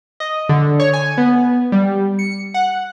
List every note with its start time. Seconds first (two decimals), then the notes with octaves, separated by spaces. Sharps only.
0.20 D#5
0.49 D3
0.80 C#5
0.93 G#5
1.18 B3
1.72 G3
2.19 C#7
2.54 F#5